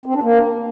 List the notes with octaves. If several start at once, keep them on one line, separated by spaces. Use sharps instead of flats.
C4
D4
A#3